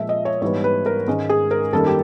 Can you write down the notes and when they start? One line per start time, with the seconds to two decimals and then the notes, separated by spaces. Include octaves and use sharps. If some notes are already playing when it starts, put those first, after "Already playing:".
Already playing: A#2 F3 G#3 E5
0.09 D#5
0.25 C#5
0.42 G#2 E3 G3 B3 C#5
0.64 B4
0.86 A#4
1.07 G#2 D#3 G#3 C#4
1.29 G#4
1.51 A#4
1.73 F#2 D#3 G3 A#3 A4
1.87 G4